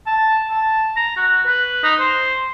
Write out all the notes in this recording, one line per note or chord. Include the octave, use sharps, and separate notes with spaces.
A5
A5
A#5
F#4
B4
D#4
C5